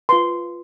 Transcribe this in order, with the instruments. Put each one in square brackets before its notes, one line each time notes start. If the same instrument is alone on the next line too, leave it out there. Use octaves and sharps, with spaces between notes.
[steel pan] F4 B4 C6